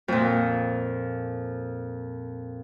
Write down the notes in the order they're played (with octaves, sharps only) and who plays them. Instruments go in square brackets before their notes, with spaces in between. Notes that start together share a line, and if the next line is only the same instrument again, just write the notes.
[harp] F2 A#2